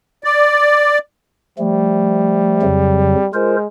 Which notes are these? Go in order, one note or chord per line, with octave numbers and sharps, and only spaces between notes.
D5
F3 G3 A3
F2 C#3 F#3
G#3 F4 A#4 C5